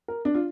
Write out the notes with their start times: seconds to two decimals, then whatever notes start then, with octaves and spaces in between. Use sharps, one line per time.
0.08 A#4
0.25 D4
0.35 F4